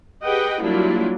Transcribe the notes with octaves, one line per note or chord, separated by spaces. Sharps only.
G4 G#4 B4 D#5 F#5 G5
F#3 G3 A#3 D4 E4 F4